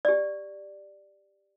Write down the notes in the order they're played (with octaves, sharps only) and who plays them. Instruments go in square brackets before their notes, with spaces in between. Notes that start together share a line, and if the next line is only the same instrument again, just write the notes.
[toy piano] G4 D5